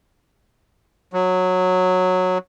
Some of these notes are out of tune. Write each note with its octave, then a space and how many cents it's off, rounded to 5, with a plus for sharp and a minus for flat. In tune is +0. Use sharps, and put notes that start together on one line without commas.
F#3 -10